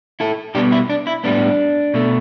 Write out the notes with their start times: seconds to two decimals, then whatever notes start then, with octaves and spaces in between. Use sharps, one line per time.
0.20 E4 A4
0.55 B2 G3 B3 D4 G4
0.72 E4
0.90 D4
1.07 E4
1.24 A2 G3 B3 D4
1.94 B2 A3